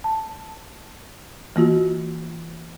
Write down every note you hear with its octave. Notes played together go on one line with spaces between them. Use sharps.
A5
E3 A#3 F4 F#4